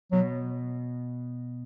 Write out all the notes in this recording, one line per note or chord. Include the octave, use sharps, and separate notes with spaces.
B2 F#3